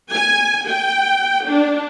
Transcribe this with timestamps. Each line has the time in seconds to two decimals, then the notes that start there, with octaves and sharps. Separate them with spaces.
0.12 G#5
0.67 G5
1.47 D4